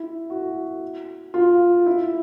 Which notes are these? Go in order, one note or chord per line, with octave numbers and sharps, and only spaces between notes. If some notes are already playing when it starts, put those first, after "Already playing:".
Already playing: E4
F#4
F4
E4